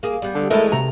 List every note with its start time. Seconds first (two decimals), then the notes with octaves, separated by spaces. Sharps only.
0.03 A#3 G#4
0.22 G3 B3
0.35 D3 A5 D#6 E6
0.50 E2 G#3 A3 E4 A4 A#4 D#5
0.72 C3 F#4 A#5